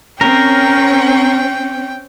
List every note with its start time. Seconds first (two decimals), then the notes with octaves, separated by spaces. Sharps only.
0.21 C4 C#4 A#4 G5